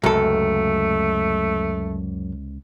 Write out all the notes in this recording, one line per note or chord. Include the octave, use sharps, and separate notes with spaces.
C#2 F#2 C3 A3 A4